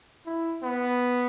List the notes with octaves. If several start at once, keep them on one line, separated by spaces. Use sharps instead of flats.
E4
B3